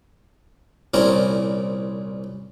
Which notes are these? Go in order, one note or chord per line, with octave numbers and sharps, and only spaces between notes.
C2 A#2 C4 C#4 E4 A#4